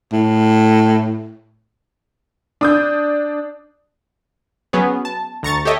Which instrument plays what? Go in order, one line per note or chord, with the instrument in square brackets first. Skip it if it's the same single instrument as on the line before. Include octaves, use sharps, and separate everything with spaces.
[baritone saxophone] A2
[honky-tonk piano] D4 D#6 G6
[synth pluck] F#3 B3 C#4 G#4
A5
D2 A#5 C#6 A6
G4 A4 C#5 D#5 E5